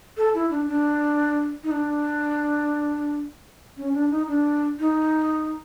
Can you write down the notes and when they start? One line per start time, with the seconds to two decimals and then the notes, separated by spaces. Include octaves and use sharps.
0.17 A4
0.34 E4
0.50 D4
0.68 D4
1.64 D#4
1.71 D4
3.77 C#4
3.94 D4
4.11 D#4
4.28 D4
4.79 D#4